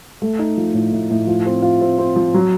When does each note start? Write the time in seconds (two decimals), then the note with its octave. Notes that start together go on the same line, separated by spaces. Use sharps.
0.22 A3
0.39 D#4
0.57 F3
0.74 A2
0.92 A2
1.10 A2
1.27 F3
1.46 C4
1.62 F4
1.81 C4
1.98 C4
2.16 F3
2.34 F#3